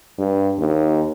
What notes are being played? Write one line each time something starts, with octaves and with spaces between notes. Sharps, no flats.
G2
D#2